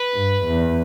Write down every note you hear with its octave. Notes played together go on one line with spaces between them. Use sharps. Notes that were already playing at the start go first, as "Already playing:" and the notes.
Already playing: B4
G2
E2